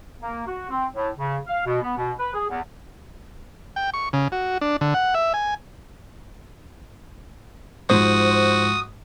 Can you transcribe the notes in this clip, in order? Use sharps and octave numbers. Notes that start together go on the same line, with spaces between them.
A#3
F#4
C4
A2
C#3
F5
B2
B3
B2
B4
G#4
E2
G5
C#6
C#3
F#4
D4
D3
F#5
E5
G#5
G#2 F3 F#4 C5 D#6